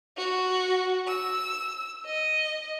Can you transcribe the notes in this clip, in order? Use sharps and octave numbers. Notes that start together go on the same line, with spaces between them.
F#4
E6
D#5